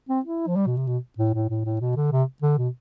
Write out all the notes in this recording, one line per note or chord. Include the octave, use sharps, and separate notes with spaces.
C4
E4
F3
G3
B2
C3
B2
A2
A2
A2
A2
B2
D3
C3
D3
B2